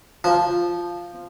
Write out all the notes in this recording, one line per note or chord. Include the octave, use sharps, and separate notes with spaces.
F3